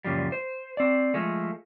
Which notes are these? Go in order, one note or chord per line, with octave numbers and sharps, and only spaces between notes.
F#2 A#2 C#3 F3 G3
C5
C4 D5
F3 G#3 A3